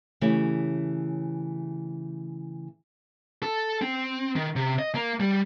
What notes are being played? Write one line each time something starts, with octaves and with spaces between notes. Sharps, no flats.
C#3 E3 A3 G4 C#5
A4
C4
D#3
C3
D#5
A#3
G3